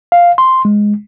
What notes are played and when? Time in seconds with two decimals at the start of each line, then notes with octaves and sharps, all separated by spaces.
0.12 F5
0.38 C6
0.65 G#3